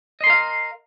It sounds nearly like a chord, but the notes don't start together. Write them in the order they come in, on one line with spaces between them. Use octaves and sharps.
D#5 C6 A#4 F5